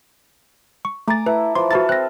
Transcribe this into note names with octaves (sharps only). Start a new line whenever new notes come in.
C#6
A3 G#5 A#5 D6 A6
E4 A4 B4
E3 F3 C6
F#4 A4 B4 F5 A6
C4 F#6 A#6